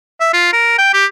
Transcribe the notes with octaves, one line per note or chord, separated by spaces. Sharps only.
E5
F4
A#4
G5
G4